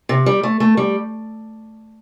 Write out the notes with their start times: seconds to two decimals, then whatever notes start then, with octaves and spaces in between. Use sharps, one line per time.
0.09 C3
0.26 G3
0.43 A3
0.60 A3
0.77 G3